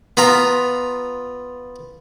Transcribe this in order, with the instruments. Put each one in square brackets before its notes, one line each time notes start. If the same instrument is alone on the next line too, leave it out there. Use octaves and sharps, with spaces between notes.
[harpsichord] B3 F4 A#5